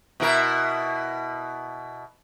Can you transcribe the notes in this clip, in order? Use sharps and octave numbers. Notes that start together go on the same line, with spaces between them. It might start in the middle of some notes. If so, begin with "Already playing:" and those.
B2 E4 A#4